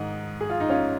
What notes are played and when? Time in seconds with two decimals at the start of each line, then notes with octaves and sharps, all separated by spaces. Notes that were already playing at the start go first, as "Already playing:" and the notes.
Already playing: G#2 D#3 D#4
0.41 G#4
0.50 F4
0.60 D#4
0.70 C#4 F4